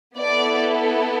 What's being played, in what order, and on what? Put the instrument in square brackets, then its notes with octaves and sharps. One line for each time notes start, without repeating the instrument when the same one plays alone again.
[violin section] B3 E4 A4 D5